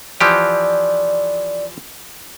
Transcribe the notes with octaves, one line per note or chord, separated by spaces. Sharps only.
E3 F3 G4 D5